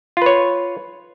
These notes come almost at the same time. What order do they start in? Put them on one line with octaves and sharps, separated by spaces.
F4 B4 C#5